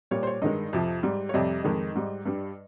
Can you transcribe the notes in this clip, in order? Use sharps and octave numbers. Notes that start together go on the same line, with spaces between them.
A#2 G3 C#5
C5
C#5
G2 D#3 G#3 D#5
F2 C3 F3
G#2 G3
C#5
F2 C3 G3 D#5
F2 D#3 G#3
G#2 G3
G2 G3